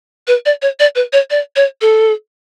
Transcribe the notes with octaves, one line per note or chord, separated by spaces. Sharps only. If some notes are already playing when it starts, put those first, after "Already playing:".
B4
D5
C#5
D5
B4
C#5
D5
C#5
A4